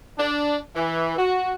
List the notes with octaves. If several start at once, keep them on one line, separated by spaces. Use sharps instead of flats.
D4
E3
F#4